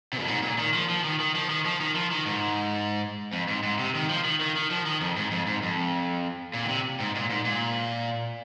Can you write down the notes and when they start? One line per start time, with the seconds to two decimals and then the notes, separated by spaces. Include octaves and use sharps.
0.13 C3
0.20 F2
0.28 G#2
0.43 A#2
0.58 D#3
0.73 F3
0.90 F3
1.04 D#3
1.20 D#3
1.35 F3
1.50 D#3
1.66 F3
1.80 D#3
1.95 F3
2.11 D#3
2.26 G#2
3.33 F2
3.48 G#2
3.63 G#2
3.79 C3
3.95 D#3
4.09 F3
4.24 D#3
4.41 D#3
4.56 D#3
4.71 F3
4.86 D#3
5.01 F2
5.17 G#2
5.31 F2
5.47 G#2
5.62 F2
6.54 A#2
6.65 D#3
6.69 C3
7.00 G#2
7.15 A#2
7.30 G#2
7.45 A#2